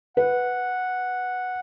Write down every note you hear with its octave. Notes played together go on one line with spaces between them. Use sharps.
B4 F#5